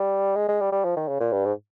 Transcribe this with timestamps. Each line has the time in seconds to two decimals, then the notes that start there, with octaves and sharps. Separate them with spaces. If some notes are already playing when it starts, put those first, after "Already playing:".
Already playing: G3
0.36 G#3
0.48 G#3
0.61 G3
0.72 G3
0.84 F3
0.97 D#3
1.08 C#3
1.20 A#2
1.32 G2
1.45 G#2